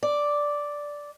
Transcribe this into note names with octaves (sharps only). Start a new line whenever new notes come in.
D5